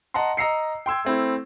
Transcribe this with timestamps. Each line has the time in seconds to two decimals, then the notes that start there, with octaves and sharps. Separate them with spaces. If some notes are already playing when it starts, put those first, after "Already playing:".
0.14 D#5 F#5 A5 A#5 C6
0.37 D#5 A#5 E6 C7 C#7
0.86 G5 C6 E6 G#6
1.05 A3 C4 E4